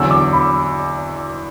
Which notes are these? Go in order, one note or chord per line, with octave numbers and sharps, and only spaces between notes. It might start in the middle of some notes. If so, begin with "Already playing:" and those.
Already playing: E2 D3 F#3 E6
D6
B5